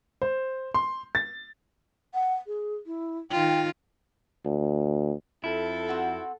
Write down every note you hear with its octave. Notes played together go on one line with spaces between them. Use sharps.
C5
C6
A6
F#5
G#4
E4
D#3 F4 G5
D2
F2 E4 A4
C4 F#4